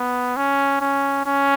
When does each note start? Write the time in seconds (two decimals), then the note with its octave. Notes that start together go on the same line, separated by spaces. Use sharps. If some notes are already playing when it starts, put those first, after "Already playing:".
Already playing: B3
0.36 C#4
0.81 C#4
1.26 C#4